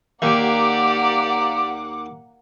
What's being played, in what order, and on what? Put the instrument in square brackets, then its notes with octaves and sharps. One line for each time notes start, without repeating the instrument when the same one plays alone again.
[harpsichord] D#2 [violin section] A#3 F#5 [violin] G4 D5 [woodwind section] D6